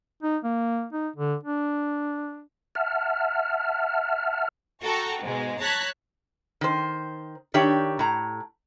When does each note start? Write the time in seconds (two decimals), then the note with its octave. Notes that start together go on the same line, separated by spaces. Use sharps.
0.23 D#4
0.44 A#3
0.93 D#4
1.16 D3
1.44 D4
2.75 E5 F#5 A5 F6
4.83 F#4 A4 G5 A#5 C#6
5.21 G#2 B2 G#3
5.60 C#5 A5 A#5 F#6 G#6 B6
6.61 D#3 C5
7.54 D#3 D4 G4 C#5 E5
7.99 A2 A#5